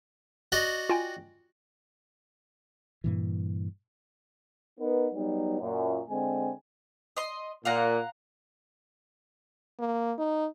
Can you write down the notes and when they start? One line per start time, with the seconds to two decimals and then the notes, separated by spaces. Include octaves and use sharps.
0.52 F#4 D5 D#5
0.89 F4 G5 G#5
3.04 G2 A#2 E3
4.79 B3 D#4 A#4 B4
5.14 F#3 G3 B3 D#4
5.61 F#2 A#2
6.09 D3 G#3 C4 G#5
7.17 D#5 C6
7.65 A#2 F5 F#5 A#5
9.80 A#3
10.18 D#4